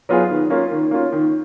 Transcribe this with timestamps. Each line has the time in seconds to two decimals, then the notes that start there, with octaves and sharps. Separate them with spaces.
0.09 F#3 B3 F4 G#4
0.30 D#3
0.50 A#3 C#4 F4
0.71 D#3
0.91 A#3 C#4 F4
1.12 D#3